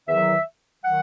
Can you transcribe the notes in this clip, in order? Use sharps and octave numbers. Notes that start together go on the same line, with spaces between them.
E2 D#3 F#3 E5
D#3 F#3 F#5